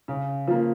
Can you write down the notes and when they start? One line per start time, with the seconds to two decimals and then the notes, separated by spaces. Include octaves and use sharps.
0.08 C#3
0.48 F3 A#3